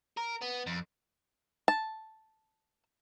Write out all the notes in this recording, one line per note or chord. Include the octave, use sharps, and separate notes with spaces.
A#4
B3
F2
A5